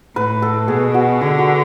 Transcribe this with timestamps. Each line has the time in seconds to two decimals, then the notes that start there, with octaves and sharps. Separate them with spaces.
0.16 A2 B4
0.42 A4
0.68 B2 G#4
0.94 F#4
1.21 D3 G#4
1.39 F#4